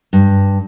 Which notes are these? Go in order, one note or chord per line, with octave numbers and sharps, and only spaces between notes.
G2